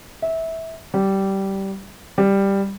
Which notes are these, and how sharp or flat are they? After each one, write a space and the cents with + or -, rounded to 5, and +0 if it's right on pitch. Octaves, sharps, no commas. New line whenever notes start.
E5 -20
G3 -15
G3 +5